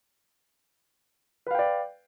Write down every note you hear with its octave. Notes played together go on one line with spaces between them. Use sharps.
B4 D5 F5 G5